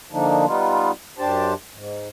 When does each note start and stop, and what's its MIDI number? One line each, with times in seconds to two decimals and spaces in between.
0.12 0.46 50
0.12 0.46 53
0.12 0.46 58
0.12 0.46 62
0.12 0.46 63
0.46 0.91 55
0.46 0.91 59
0.46 0.91 63
0.46 0.91 65
1.19 1.54 42
1.19 1.54 62
1.19 1.54 67
1.19 1.54 72
1.19 1.54 81
1.74 2.09 44